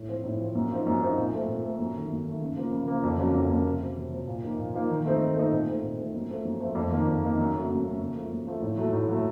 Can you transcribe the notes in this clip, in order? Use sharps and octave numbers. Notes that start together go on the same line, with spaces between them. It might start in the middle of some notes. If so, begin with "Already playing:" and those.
Already playing: A2
F3 C4
A2
F3 C4
F#2
F3 C4 D#4
F#2
F3 C4 D#4
A#2
A3 C4
A#2
A3 C4
F#2
D#3 A3
F#2
D#3 A3
C#3
F3 A#3
C#3
F3 A#3
F2
C#3 F#3 A#3 C#4
F2
C#3 F#3 A#3 C#4
C3
F#3 C4
C3
F#3 C4
A#2
F3 A#3 D#4
A#2
F3 A#3 D#4
D#3
A3 C4 D#4
D#3
A3 C4 D#4
A#2
A3 C4 D#4
A#2
A3 C4 D#4
F#2
F3 A3 C4
F#2
F3 A3 C4
F2
D#3 A#3 D#4
F2
D#3 A#3 D#4
F#2
C#3 F#3 A3
F#2
C#3 F#3 A3
F#2
F3 A3
F#2
F3 A3
A2
F#3 A3
A2
F#3 A3